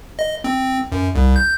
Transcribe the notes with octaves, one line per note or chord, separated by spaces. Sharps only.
D#5
C4
F#2
C2
G6